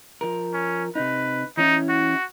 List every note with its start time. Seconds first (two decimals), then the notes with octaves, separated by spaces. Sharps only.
0.21 F3 A#4
0.54 C#4
0.95 C3 D#4 B4
1.57 E3 C#4 D#4 E4
1.89 F#4